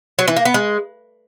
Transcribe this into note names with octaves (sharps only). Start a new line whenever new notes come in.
F#3
E3
A#3
B3
G#3